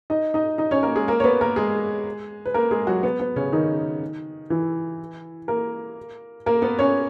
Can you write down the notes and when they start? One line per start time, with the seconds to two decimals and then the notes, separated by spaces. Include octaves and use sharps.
0.10 D#4 D#5
0.34 D#4 D#5
0.58 D#4 D#5
0.71 C#4 C#5
0.83 A#3 A#4
0.96 G#3 G#4
1.08 A#3 A#4
1.20 C#5
1.24 B3 B4
1.41 A#3 A#4
1.56 G#3 G#4
2.46 B4
2.54 A#3 A#4
2.71 G#3 G#4
2.87 F#3 F#4
3.03 B3
3.20 B3
3.36 C#3 C#4
3.52 D#3 D#4
4.50 E3 E4
5.48 A#3 A#4
6.46 A#3 A#4
6.62 B3 B4
6.79 C#4 C#5